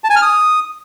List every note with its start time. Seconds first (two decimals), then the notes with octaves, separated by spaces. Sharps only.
0.04 A5
0.10 G#5
0.16 F6
0.22 D#6